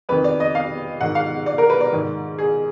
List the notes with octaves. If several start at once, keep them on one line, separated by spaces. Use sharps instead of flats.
F2 D#3 B4
D5
D#5
F5
G#2 D#3 F#5
F5
D5
A#4
B4
D5
G#2 D#3
G#4